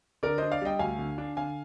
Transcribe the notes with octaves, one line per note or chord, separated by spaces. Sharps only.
D3 A#4 D5
D4 C5 D#5
D5 F5
G3 D#5 G5
D2 F5 G#5
D3
D4
D3 F5 G#5